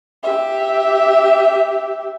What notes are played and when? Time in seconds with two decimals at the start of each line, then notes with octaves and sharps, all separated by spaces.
0.23 G4 E5